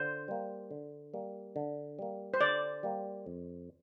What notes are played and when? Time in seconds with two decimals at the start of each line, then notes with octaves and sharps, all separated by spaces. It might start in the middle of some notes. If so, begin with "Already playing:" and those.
Already playing: D3 C5
0.28 G3 A#3
0.71 D3
1.14 G3 A#3
1.56 D3
1.99 G3 A#3
2.34 C5
2.41 D3 D5
2.83 G3 A#3
3.26 F2